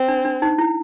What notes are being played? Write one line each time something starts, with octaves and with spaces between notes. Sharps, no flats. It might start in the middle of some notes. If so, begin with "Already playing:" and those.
Already playing: C4
D4
D4
D#4
E4